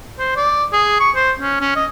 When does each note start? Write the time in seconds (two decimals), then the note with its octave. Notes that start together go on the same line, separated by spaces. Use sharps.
0.19 C5
0.37 D5
0.73 G#4
1.00 C#6
1.15 C5
1.40 C#4
1.61 C#4
1.76 D#5